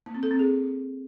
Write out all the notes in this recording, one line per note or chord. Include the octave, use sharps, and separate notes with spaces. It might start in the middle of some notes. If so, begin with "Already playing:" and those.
A#3
C4
A4
C4
G#4